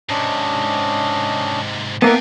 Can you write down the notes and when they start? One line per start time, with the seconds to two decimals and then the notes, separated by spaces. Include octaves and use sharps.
0.09 G#2 C3 C#4 D4 D#5
2.02 A#3 B3 D#4 E5 F#5 G5 A5